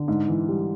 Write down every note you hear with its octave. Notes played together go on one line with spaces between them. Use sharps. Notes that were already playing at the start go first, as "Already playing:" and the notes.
Already playing: D3
G#2
E3
G3